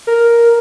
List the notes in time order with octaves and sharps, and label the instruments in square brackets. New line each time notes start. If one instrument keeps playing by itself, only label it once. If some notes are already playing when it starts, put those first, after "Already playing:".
[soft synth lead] A#4